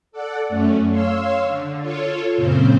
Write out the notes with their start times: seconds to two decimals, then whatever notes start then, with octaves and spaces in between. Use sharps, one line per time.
0.12 A4 D5 F#5
0.49 F#2 A3 C#4
0.89 C#5 F5 C6 E6
1.44 D3
1.81 F4 A4 C#5
2.36 F#2 A#2 C#3 C4 C5